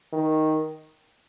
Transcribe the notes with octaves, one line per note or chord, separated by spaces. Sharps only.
D#3